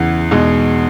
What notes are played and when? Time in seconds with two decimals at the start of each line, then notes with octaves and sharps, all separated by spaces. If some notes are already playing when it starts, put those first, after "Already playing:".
Already playing: E2 C#3 E3
0.31 E2 B2 G#3 D#4